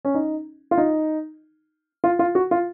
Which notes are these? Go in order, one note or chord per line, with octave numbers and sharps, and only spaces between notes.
C#4
D#4
F4
D#4
F4
F4
F#4
F4